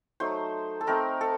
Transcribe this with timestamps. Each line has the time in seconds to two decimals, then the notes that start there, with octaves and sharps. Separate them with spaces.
0.20 F#3 A3 D#4 C5
0.81 A4
0.87 A3 C4 D#4 A#4
1.21 A4